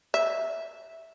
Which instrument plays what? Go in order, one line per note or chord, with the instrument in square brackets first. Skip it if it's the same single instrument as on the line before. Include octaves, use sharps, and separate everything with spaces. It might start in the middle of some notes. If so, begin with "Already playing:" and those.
[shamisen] E5